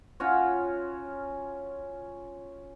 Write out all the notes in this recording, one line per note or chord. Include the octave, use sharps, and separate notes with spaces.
C#4 F4 F#4 C#5